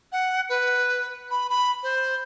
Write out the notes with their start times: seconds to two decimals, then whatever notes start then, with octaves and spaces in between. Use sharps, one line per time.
0.12 F#5
0.49 B4
1.31 B5
1.50 B5
1.83 C5